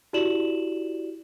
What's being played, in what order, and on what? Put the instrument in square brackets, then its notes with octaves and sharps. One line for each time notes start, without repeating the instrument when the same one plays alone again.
[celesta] E4 F#4 G4 D5 E7 F#7